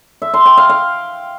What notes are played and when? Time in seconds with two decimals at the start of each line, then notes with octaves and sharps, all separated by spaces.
0.22 E5
0.34 C6
0.46 G5
0.58 F5
0.69 F5